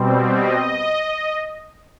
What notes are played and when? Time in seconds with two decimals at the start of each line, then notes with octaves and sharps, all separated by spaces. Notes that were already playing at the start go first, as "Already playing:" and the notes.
Already playing: B2 G3 C4
0.34 D#5